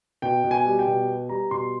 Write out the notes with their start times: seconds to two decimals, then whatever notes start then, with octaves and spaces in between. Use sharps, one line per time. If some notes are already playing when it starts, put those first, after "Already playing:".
0.22 B2 G5
0.44 B2
0.51 G#5
0.65 G3
0.79 G5
0.87 B2
1.08 B3
1.29 G3 A#5
1.51 B2 C6